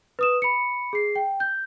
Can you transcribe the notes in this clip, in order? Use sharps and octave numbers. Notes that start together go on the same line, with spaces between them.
B4 D#6 E7
B5 C#7
G#4 C7
G5
G6